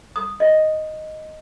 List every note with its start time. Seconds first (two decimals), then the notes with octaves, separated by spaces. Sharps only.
0.16 D#6
0.40 D#5